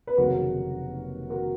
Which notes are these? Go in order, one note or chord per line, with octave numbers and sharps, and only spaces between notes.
B4
F1 D#2 C#3 F#3 F#4 A#4
F#4 A#4